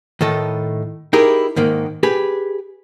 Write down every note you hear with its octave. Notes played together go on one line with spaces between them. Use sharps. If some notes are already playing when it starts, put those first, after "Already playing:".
A2 D#3 A4 D#5
D#4 E4 G4 G#4 A#4
G#2 D#3 A#3
G4 G#4 B4